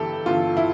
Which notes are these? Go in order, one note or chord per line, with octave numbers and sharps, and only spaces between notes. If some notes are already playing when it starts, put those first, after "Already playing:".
Already playing: G1 G2 E3 G4 A4
G1 G2 E3 F4
E4